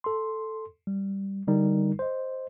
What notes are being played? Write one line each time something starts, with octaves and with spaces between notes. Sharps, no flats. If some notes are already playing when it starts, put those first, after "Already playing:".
A4 C6
G3
D3 G3 D#4 A#4
C5 D#5